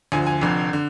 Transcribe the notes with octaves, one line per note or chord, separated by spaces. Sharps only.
D2 D3 F3 G#5
G#5
F1 F2 D3
D3